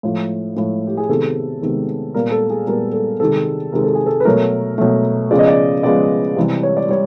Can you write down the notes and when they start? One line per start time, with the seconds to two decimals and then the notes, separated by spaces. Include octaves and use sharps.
0.03 A2 F3 A3
0.56 A2 F3 A3
0.87 G4
0.97 G#4
1.09 C3 D#3 G#3 B3 A4
1.62 C3 D#3 G#3 B3
2.14 A#2 G3 B3 A#4
2.32 A4
2.50 G#4
2.67 A#2 G3 B3 A#4
2.93 A4
3.20 C3 D#3 G#3 A4
3.72 C3 D#3 G#3 A#4
3.84 A4
3.95 G#4
4.06 A4
4.20 B4
4.25 B2 F#3 A3 A#4
4.78 B2 F#3 A3
5.31 C#3 F3 G#3 B3 D5
5.39 D#5
5.48 D5
5.83 C#3 F3 G#3 B3 D5
6.37 C3 E3 G3
6.63 C#5
6.77 D5
6.89 G3 C#5